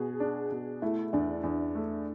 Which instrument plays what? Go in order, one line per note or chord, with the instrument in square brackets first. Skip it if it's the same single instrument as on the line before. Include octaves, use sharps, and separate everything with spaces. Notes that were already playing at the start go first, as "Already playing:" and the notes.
Already playing: [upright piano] B2 [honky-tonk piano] G#4
[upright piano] D4
B2
[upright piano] A3 [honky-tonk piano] E4
[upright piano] E2 [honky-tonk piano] D4
[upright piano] E2
A3